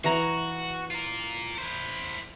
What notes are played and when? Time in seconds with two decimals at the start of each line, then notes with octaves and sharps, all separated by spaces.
0.04 E3 F#4 A#5
0.91 F4 A#4
1.58 E4 C5